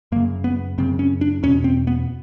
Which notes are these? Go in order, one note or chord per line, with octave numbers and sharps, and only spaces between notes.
F#2 C#3 A#3
B3
F#2 C#3 C4
C#4
D4
E2 B2 C#4
C4
B3